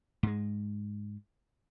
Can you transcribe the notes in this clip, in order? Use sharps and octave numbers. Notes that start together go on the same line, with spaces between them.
G#2 G#3